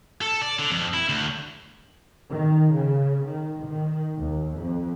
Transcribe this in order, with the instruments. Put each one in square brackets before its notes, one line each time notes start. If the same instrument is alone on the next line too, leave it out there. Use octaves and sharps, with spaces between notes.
[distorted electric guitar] A4
D5
D3
F2
E4
D2
[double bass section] D#3
C#3
D#3
D#3
D#2
F2